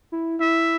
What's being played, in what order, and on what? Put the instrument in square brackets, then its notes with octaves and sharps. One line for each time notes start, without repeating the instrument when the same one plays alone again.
[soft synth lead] E4
[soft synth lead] E4 [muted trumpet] E5